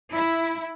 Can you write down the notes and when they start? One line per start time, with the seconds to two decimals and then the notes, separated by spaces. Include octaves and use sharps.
0.13 E4